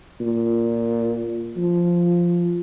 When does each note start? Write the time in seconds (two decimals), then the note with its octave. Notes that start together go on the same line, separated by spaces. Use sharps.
0.21 A#2
1.57 F3